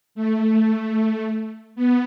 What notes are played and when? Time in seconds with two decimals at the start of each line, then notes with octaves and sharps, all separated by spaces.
0.15 A3
1.76 B3